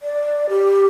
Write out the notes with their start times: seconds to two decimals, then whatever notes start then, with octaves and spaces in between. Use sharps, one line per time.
0.01 D5
0.49 G4